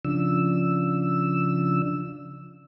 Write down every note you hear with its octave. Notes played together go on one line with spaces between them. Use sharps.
C#3 F3 D4 E6